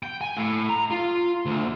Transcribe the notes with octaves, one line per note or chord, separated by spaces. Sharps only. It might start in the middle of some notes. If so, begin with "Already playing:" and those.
G5
G#5
A2
A#5
F4
D2